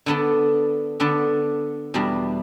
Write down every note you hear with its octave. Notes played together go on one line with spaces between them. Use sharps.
D3 B3 D4 A4
D3 B3 D4 A4
E2 B2 G3 D4